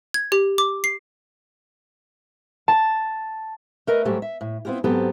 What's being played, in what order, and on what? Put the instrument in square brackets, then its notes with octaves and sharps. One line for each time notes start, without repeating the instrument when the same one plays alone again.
[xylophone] G#6
G4
D6
C7
[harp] A5
[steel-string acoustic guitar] A3 A#4 B4 D#5
G#2 F#3 G3 A3 G4
E5
A2
B3 C4 E4 F4 G4
G#2 F#3 B3 C4 G4 A4